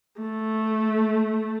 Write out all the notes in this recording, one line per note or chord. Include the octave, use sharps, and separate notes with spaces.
A3